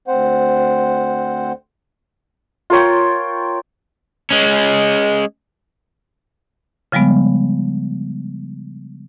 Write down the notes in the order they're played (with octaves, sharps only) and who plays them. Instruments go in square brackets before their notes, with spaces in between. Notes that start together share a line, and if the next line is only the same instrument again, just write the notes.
[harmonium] D2 C4 C5 F#5
[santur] F4 A#4 C#5 G5
[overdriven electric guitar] G#3 C#4
[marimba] C#3 F3 G3 G#3 B3